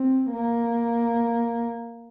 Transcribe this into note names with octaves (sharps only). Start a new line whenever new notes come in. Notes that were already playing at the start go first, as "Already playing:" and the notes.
Already playing: C4
A#3